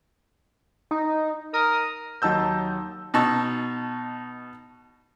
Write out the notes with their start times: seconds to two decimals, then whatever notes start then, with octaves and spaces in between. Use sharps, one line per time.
0.91 D#4
1.54 A#4 D#6
2.22 D#2 F#3 D#4 A5 E6 G6
3.14 B2 D#4 A5 C#6 E6